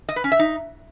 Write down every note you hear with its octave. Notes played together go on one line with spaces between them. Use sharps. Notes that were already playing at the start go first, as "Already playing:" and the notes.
D#5
B4
C#4
E5
D#4